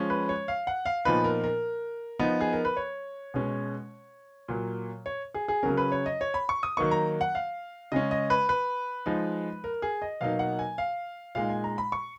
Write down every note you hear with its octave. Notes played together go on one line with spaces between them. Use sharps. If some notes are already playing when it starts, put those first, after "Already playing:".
Already playing: F3 G#3 C#4
B4
C#5
F5
F#5
F5
A#2 F3 B3 D#4 B4
A#4
A#4
F3 B3 D#4
G#4
A#4
B4
C#5
B2 G#3 C#4
A#2 F#3 A#3
C#5
G#4
G#4
C#3 F#3 C#4 A#4
B4
C#5
D#5
C#5
B5
C#6
D#6
D#3 F#3 A#3 D#4 C#6
A#5
F#5
F5
C#3 G#3 C#4 D#5
D#5
B4
B4
F3 G#3 D#4
A#4
G#4
D#5
B2 F#3 A#3 D#4 F5
F#5
G#5
F5
A#2 G#3 D#4 F5
G#5
A#5
B5
C#6